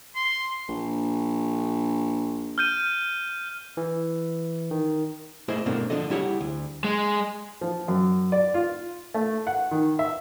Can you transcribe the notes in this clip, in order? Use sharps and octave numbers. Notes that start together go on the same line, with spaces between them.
C6
A#1
F6 G6 D#7
E3
D#3
A3 A#3 E4 G#4 C5 D#5
G2 B2 A3 A#3 C4 D4
D3 F3 A4 D#5
G3 E4 G4 C#5 F#5
D2
G#3
F3
F#2
D5
F4
A3
F#5
D#3
E5